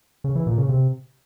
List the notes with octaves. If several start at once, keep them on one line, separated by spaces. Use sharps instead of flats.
C#3
E3
A#2
C#3
C3